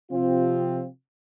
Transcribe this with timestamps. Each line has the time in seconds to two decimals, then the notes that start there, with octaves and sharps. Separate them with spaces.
0.11 C3 F3 C4 F4